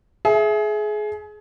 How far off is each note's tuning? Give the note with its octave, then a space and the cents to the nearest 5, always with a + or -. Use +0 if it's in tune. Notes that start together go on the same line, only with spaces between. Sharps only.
G#4 +25 E5 +0